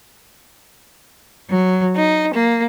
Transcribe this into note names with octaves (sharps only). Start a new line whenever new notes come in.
F#3
D#4
A#3